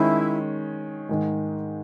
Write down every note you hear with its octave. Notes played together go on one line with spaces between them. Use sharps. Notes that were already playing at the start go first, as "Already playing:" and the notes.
Already playing: D#3 G#3 C#4 E4
G#2 D#3 G#3